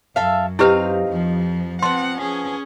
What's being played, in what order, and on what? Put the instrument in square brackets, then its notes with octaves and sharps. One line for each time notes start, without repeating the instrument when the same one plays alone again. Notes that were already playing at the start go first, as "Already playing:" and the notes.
[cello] F#2 [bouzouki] A4 E5 F5
[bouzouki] C4 D#4 F5 [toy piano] E4 G4 B4
[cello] F2 F3
[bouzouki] F3 B3 [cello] C4 F#5 [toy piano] C6
[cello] C#4 G#4